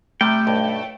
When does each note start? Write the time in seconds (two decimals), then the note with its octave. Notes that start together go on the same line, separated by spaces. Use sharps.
0.21 C3 G3 A3 G5
0.47 B1 G2